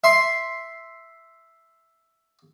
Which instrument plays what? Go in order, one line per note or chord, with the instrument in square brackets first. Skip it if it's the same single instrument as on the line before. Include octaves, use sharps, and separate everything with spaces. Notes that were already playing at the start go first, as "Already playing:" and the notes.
[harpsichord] E5 C6